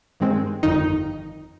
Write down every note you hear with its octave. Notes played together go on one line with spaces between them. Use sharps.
G2 D#3 G#3 C4
G1 F2 D#3 D#4